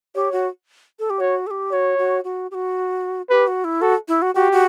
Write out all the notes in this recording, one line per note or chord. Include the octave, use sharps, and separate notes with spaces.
G4 C#5
F#4
A4
G4
F#4 C#5
A4
G4
F#4 C#5
F#4
F#4
G4
F#4
G4 B4
F#4
E4
F#4 A4
E4
F#4
F#4 G4
F#4